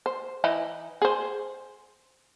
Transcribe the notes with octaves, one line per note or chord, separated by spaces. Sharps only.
C5
E3 D#4 E4
G#4 C5